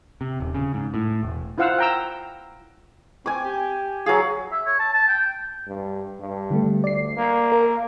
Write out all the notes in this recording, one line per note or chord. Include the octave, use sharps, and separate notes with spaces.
C3
D#1
C#3
G#2
A2
E1
E4 F4 C5 F5 F#5 E6
G5 A#5 E6
C4 G#5 D6
G4
F#3 G#4 F5
E5
C#5
A5
A5
G5
G2
G2
D3 G3 A3
D2 D5 C7
A#3
A#4